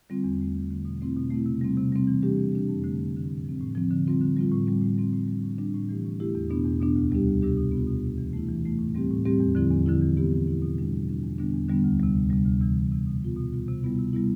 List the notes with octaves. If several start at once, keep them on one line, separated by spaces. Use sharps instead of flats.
D3 G3 C4 F4
E2
D3 A3 C4
E2
D3 A3 C4
B2
A3 C4 E4
B2
A3 C4 E4
C3
G3 C4
C3
G3 C4
E3
G3 D4 G4
E3
G3 D4 G4
F2
D3 A3
F2
D3 A3
A2
F3 C4
A2
F3 C4
D3
G3 C4 F4
D3
G3 C4 F4
A2
G3 C4
A2
G3 C4
A2
G3 D4
A2
G3 D4
A2
E3 A3 E4 G4
A2
E3 A3 E4 G4
E2
B2 B3 D4
E2
B2 B3 D4
D2
C3 G3 D4 G4
D2
C3 G3 D4 G4
B2
B3 F4
B2
B3 F4
E3
A3 E4
E3
A3 E4
A2
G3 C4 G4
A2
G3 C4 G4
E2
D3 F3 C4 E4
E2
D3 F3 C4 E4
E3
B3 E4 G4
E3
B3 E4 G4
B2
G3 D4 F4
B2
G3 D4 F4
E2
D3 G3 B3 D4
E2
D3 G3 B3 D4
D2
C3 G3
D2
C3 G3
D2
C3 E3
D2
C3 E3
B2
G3 B3 F4
B2
G3 B3 F4
C3
G3 B3 E4
C3
G3 B3 E4